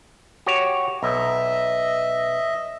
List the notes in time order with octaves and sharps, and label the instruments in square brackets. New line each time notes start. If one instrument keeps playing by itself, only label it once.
[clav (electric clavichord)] F#4 G4 C#5
[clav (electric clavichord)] B1 [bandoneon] D#5 E5